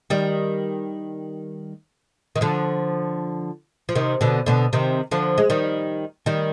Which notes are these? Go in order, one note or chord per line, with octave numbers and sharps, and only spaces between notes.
D#3 G3
D#3
D3 F3
F3
C3 D#3
B2 D3
B2 D3
C3 D#3
D3 F3
G#3
D#3 G3
D#3 G3